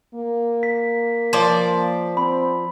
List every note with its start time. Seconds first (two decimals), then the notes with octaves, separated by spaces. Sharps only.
0.15 A#3
0.63 B6
1.33 F3 D5
2.17 C4 B5